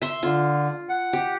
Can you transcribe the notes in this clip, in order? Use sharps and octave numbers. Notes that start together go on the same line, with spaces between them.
E5 C6
D3 F4
F#5
G4